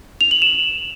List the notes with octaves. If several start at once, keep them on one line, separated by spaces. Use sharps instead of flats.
F7
F#7
E7